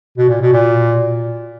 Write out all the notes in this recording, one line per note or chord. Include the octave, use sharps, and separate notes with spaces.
B2
A#2
B2
A#2